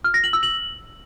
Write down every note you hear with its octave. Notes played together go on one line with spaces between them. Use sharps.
F6
A#6
F#7
E6
F#7